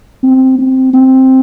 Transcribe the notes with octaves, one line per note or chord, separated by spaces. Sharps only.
C4
C4
C4